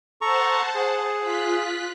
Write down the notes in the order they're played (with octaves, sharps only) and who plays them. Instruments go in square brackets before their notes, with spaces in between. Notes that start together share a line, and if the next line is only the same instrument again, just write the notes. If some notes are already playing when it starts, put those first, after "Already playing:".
[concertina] A4 A#5 C#6 [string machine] C5 F#5 A5
[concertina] G#4
[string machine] F4 F#6 B6